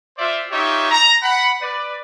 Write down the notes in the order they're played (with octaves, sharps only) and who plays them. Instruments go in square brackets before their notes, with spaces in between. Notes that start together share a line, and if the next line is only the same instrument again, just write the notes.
[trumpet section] F4 C5 D5 E5
D#4 F4 G4 C#5 E5
A#5
F#5 B5
B4 D5